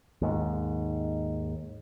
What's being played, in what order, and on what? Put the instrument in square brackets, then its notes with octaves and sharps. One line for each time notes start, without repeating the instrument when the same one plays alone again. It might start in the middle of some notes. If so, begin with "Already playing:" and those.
[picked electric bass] D#2 G#2